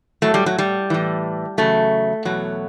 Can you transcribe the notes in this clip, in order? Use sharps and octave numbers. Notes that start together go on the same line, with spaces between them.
A2 F#3 A3
G3
F#3
G3
A2 E3
E2 C#3 F#3 A3
E2 B2 F#3